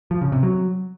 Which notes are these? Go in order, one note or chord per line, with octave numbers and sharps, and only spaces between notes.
F3
C#3
C3
F#3